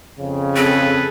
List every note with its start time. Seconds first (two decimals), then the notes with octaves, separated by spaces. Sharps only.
0.20 F2 C#3
0.56 C4 G#4 A4 B4